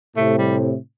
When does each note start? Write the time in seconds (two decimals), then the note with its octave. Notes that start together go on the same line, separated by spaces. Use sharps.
0.16 A2 C3 A3
0.38 G3